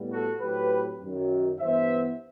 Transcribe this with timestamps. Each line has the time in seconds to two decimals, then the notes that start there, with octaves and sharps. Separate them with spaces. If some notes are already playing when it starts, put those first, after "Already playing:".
Already playing: A2 G3 B3
0.11 F#4 A4
0.41 A2 F#3 C4 G4 B4
1.01 F#2 D#3 F#3
1.60 G2 E3 B3 C5 E5